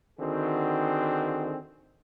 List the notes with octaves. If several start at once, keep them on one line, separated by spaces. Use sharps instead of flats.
D3 D#3 C4 F#4 G#4